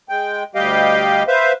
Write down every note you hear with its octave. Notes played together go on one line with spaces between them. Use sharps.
G#3 G5
D2 G3 G4 D#5 F5 G5
B4 C5 E5 F5